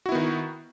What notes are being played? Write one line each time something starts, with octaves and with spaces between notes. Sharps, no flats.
D#3 B3 E4 F#4